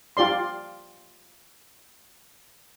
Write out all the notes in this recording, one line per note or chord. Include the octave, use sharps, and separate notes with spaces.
F4 G4 D5 C6